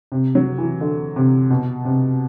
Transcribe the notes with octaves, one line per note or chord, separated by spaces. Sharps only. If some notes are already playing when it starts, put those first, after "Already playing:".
C3
F#3
E3
D3
C3
B2
C3